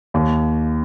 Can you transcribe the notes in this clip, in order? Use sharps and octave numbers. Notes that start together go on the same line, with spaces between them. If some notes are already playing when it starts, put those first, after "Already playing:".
D#2